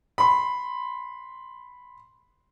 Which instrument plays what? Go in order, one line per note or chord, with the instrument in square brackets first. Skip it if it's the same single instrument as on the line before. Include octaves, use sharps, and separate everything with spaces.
[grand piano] B5 C6